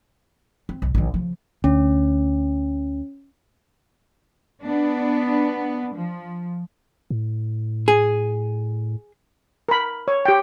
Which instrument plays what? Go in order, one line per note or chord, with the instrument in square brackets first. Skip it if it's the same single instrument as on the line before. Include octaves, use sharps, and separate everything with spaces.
[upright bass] C4
B1
A#1 D#3
C#3 F3
[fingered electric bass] D2 [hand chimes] C#4
[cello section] B3 D4
F3
[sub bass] A2
[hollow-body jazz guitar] G#4
[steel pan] A#4 B5
C#5
G4 G5